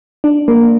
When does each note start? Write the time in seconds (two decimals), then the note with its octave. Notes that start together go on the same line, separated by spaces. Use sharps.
0.24 D4
0.48 A#3